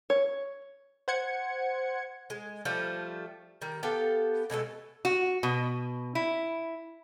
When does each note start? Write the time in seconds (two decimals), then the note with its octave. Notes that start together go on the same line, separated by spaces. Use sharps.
0.10 C#5
1.08 C5 F#5 G#6 C#7
2.30 G#3
2.65 F3 G3 A3
3.62 D#3 G3
3.83 B3 G4 A4 F5
4.50 B2 G#3 A3 A4
5.05 F#4
5.43 B2
6.15 E4